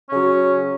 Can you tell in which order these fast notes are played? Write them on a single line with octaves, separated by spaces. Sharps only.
C#4 C#3 F#3